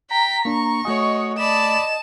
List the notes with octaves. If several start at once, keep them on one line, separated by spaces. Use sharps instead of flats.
G5 A#5 B6
A#3 D4 C#6
A3 F#4 C#5 D#5 G#5
D5 A5 B5 E7